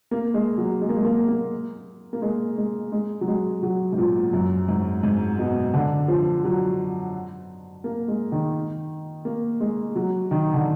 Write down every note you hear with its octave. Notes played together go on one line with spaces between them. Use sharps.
A#3
G#3
F#3
G#3
A#3
G#3
A#3
A#3
A#3
G#3
G#3
G#3
F#3
G#3
F#3
G#2
A#2
F#2
G#2
G#2
B2
D3
F3
F#3
A#3
G#3
D#3
A#3
G#3
F#3
D#3
D3